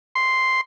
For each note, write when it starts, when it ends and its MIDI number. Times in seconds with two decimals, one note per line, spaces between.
0.15 0.61 84